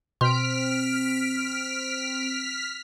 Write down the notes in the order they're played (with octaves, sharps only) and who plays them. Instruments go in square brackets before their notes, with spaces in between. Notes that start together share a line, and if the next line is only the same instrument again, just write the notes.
[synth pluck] B2 C6 [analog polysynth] C4 D7 [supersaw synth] F6 B6